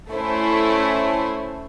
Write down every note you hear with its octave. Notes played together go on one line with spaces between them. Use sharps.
A3 C#4 E4 C5